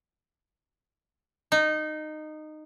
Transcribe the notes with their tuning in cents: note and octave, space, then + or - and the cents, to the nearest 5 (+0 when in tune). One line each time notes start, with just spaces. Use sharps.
D#4 -15